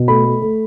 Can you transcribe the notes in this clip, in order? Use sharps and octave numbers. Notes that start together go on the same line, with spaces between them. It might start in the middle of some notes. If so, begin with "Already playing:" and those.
Already playing: B2
A3 B5
A3
A3